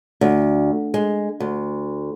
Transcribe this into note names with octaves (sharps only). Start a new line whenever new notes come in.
D2
G#3
D2